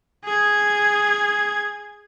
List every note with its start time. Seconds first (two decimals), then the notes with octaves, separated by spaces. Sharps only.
0.25 G#4 G#6